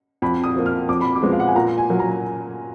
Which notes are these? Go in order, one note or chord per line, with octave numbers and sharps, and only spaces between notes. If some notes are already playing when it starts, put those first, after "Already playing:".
F2 B5
D#6
F3 A#3
F6
F2 D6
B5
D6
F3 G#3 B3
F5
F#5
G#5
A#2 A#5
G#5
F#3 A#3
A#5